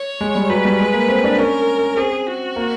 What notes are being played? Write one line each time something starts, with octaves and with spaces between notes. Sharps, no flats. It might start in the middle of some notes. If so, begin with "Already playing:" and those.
Already playing: C#5
G#3
G3
F#3 B4
G3
G#3
A#3
C4
D4
C#4 A#4
C4 G#4
F#4
A#3